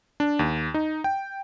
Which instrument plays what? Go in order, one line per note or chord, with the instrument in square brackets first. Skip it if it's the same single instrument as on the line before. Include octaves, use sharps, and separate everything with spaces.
[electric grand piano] D4
D#2
D#4
G5